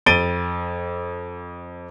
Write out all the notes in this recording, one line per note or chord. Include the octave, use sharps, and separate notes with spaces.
F2 A6 D7 D#7 G7